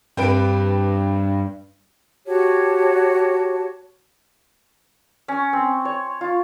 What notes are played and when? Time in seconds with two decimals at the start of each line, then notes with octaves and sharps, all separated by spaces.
0.17 G2 C4 B4 D7
2.27 F#4 G4 C#5 A5
5.28 C#4
5.53 C4
5.85 C#5
6.21 F4